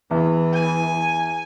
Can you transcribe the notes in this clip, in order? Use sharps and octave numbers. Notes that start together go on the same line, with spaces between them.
E2 E3
G#5